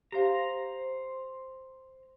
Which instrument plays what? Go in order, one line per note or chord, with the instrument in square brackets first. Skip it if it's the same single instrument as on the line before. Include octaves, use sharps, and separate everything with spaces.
[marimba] G4 F5 [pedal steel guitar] C5 A#5